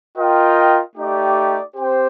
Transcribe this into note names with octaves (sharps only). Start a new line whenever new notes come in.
F4 A#4 D#5 G5
A3 D#4 G4 D5
C4 G4 C5 G5